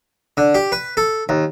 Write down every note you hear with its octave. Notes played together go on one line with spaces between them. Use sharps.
D3
G4
B4
A4
D#2